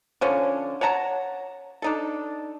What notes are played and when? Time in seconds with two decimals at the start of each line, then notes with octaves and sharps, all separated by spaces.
0.21 D3 F3 C#4
0.81 C#5 F#5 A5 A#5
1.82 D4 D#4 A4